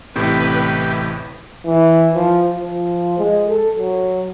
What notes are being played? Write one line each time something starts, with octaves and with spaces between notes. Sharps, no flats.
A1 A2 C3 G4 B4
E3
F3
F3
G#3
A4
F#3